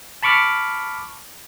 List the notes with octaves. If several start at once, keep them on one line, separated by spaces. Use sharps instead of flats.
A5 B5 C#6 D6 F6